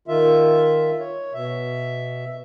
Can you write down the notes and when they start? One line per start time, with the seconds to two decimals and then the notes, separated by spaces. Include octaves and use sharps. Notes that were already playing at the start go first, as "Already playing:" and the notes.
0.08 D#3 F4 E5
1.00 C#5
1.34 B2 E5